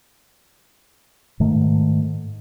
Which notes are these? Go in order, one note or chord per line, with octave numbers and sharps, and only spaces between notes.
G#2 D#3 A3